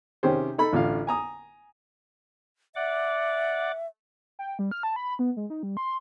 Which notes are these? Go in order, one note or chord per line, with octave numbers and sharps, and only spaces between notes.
C3 D#3 C#4 G4 G#4 C5
D#4 A4 B5
A1 D3 F4 F5
G#5 A#5 D#6
D5 E5 F#5 D6
G5
G3
F6
A5
B5
B3
G#3
D#4
G3
C6